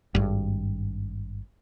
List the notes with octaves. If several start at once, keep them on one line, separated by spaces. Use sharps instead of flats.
G#1 G2